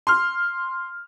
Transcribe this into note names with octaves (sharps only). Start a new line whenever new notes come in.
C6 F6